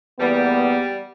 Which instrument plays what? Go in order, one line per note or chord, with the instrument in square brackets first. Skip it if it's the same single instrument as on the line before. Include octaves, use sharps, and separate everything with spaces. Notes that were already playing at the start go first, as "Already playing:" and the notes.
[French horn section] E2 A#3 B3 [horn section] G3